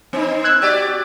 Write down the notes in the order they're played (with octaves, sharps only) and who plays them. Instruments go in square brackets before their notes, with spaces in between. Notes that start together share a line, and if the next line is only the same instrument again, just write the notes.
[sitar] B3 D#4
[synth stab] E6 F#6 G#6
[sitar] F#4 G4 D5